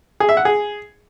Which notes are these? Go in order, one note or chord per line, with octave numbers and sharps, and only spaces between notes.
G#4
E5
F#5
G#4